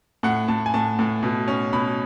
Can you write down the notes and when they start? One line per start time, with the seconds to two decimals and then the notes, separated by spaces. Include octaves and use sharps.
0.23 A2 F#5
0.48 A2 A5
0.66 G#5
0.74 A2 A5
0.99 A2
1.23 B2
1.48 C#4
1.73 B2 B5